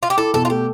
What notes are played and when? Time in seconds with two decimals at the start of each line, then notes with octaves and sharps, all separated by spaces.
0.03 F4
0.10 G4
0.17 E4 A4
0.34 B2 A4
0.45 F4
0.50 A3 G4